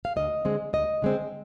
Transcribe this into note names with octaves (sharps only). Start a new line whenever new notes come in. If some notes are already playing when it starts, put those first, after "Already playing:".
F5
D2 D#5
D3 G#3 C4
D2 D#5
D3 G#3 C4